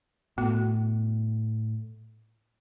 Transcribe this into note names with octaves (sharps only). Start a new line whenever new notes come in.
A2 B3 F#4